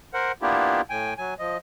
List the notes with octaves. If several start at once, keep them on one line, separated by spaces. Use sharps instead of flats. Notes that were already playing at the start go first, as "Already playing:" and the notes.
A#4 C5 F#5
A#3 B3 D4 E4 F4 G4
A2 G5 G#5
F#3 G#5
F3 D#5